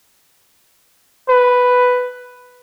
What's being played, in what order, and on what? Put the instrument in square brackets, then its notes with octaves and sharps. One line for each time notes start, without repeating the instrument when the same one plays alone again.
[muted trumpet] B4